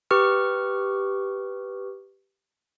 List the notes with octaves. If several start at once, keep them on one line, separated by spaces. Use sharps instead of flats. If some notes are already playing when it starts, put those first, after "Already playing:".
G4 B4 C#6 F6